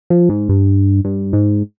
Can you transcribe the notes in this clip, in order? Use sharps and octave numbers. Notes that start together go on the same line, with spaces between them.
F3
G#2
G2
G2
G#2